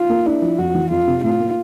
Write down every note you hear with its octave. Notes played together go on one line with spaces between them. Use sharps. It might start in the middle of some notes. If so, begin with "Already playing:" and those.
Already playing: F4
A#3
D4 E4
F3
F2 F#4
E3
F2 F4
C3
A2 F4
A#3